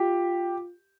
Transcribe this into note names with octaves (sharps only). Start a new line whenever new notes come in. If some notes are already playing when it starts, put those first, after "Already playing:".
Already playing: F4 G4